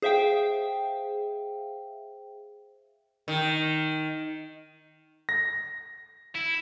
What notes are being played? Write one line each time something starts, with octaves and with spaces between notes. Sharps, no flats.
G#4 C5 E5 F5 G5
D#3
A#6
E4